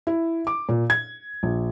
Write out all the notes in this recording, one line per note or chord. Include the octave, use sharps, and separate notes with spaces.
E4
D6
A#2
G#6
A#1